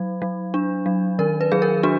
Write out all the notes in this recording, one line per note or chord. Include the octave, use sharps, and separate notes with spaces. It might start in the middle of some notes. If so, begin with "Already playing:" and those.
Already playing: F#3
F#3
D4
F#3
D#3 A#4
B4
F#3 G#4
A#4
D4 F#4